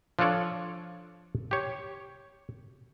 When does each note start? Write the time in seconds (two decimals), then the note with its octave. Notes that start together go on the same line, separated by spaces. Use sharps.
0.19 F3 D4 F4 A4 C#5 D5
1.51 G4 C#5